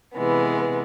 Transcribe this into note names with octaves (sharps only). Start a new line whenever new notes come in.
C3 E3 G#3 B3